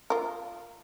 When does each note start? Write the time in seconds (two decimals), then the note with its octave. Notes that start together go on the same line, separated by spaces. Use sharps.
0.10 F4 A#4